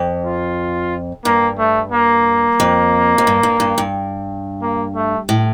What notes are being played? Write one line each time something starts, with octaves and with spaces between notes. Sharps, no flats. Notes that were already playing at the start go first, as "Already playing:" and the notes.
Already playing: F2
F4
G2 A#3
A3
A#3
F2
F2
G2
G2
G2
G2
A#3
A3
A2